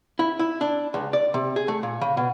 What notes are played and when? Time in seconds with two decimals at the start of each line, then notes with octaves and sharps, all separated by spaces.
0.19 E4
0.39 E4
0.61 D4
0.94 C#2
1.13 D5
1.34 C3
1.56 G#4
1.68 A3
1.83 A#2
2.01 C#3
2.17 B2